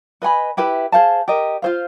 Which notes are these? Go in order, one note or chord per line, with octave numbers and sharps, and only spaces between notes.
B4 D#5 G#5 B5
E4 G4 B4 E5
G#4 C5 F5 A5
G4 A#4 D#5
F4 G#4 C5 F5